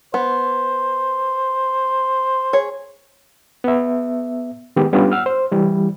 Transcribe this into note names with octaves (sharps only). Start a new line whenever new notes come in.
B3 C5
G#4 C#5
B3 E5
D#3 G#3 B3 G4
G3 B3 C#4 D4 F4 G4
F#5 E6 F6
C5
E3 G3 E4